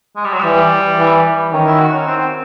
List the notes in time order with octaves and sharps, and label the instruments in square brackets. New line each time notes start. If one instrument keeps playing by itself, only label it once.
[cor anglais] G#3
G3
F#3
[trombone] E3 [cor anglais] G3
[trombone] E3
[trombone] D#3 [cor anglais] C#4
[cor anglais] E4
F#4
C#4
C4